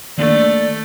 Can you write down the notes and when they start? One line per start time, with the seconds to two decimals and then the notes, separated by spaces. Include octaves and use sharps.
0.18 D#3 A3 A#3 D4 D5